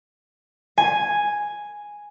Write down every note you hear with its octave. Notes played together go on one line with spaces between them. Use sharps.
G#5